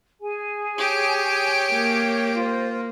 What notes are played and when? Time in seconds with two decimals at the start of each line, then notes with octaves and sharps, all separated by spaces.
0.21 G#4 G#5
0.78 G4 C#5 G5
1.73 A#3
2.36 F4 C5